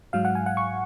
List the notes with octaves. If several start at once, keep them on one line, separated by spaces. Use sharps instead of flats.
G#2 F#3 F5
F#5
G#5
F#5
C#6